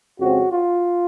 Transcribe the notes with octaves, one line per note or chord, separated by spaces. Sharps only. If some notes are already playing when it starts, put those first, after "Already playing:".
F2 C#3 F3 G#3 C4 F#4
F4